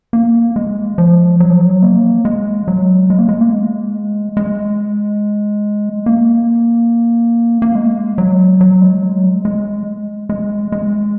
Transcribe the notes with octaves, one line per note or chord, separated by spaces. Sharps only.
A#3
G#3
F3
F#3
F3
F#3
A#3
G#3
F#3
G#3
A#3
G#3
A#3
G#3
G#3
A#3
A#3
G#3
F#3
F#3
G#3
F#3
G#3
G#3
G#3
G#3